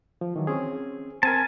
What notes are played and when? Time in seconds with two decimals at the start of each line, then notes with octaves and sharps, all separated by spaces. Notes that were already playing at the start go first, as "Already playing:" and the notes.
0.21 F3
0.36 D#3 E3 F#3
0.47 C4 C#4 G#4
1.23 C4 A#4 G#5 A5